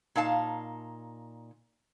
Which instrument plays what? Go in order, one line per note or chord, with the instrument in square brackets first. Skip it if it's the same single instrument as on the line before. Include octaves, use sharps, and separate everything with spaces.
[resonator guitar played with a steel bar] A#2 D#4 F5 A5